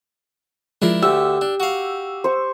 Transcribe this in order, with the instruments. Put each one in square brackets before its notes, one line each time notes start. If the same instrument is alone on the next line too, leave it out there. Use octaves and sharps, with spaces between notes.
[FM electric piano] F3 G#3 [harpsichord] D4 E4 A#4
[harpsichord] D2 A3 [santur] G4 [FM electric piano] E6
[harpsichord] D4
F#4 F5
[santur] C5 C#6